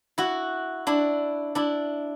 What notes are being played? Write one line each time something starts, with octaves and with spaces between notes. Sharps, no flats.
E4 F#4
D4 E4
D4 E4